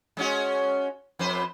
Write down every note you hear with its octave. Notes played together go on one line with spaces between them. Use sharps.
G#3 C#4 F#4
F2 B4 C5